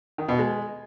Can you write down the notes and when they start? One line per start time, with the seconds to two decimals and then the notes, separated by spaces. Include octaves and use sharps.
0.18 D#3
0.29 B2
0.39 G#3